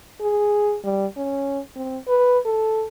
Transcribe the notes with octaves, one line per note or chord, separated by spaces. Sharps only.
G#4
G3
C#4
C4
B4
A4